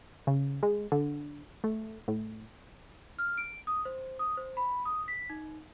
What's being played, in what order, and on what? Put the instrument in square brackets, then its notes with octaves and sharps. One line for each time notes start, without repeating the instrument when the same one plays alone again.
[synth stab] C#3
G#3
D3
A3
A2
[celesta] F6
D7
D#6
C5
D#6
C5
B5
D#6
B6
D#4